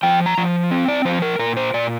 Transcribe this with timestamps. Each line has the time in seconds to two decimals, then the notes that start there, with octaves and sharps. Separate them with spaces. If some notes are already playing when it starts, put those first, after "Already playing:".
0.03 F3 G5
0.26 A#5
0.38 F3
0.71 C4
0.88 D5
1.05 F3 C5
1.22 A#4
1.39 A#2 A#4
1.57 C5
1.74 A#2 D5